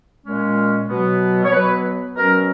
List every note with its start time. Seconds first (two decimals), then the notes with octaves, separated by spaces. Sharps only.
0.25 A#2 G#3 C#4
0.89 B2 F#3 B3
1.45 C#5
1.53 B2 F#3 B3 B4
2.16 B2 F#3 C#4 A#4